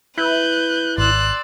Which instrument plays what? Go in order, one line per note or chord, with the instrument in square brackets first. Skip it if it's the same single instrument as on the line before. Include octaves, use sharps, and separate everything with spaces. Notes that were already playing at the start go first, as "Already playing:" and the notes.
[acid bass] E4 [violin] B4 [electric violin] F#6 G6
[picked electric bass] G#1 [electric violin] D5 E6 [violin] C6 F#6